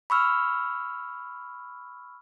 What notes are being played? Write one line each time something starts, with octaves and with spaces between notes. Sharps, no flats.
B5 C#6 E6 F6